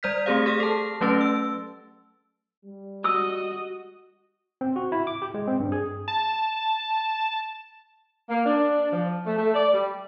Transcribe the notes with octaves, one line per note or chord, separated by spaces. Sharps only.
G3 C5 D5 F6 G6 B6
A3 C4 G4 G#4 C5 F5
G4 G#4 F6
A4 A5
F#3 A3 C#4 B4 A6
E6
G3
F#4 D#5 D#6 E6
C4
F#4
E4
D6
G4
G#3
C4
G2
G#4
A5
A#3
D4
F3
A3
A3
D5
G3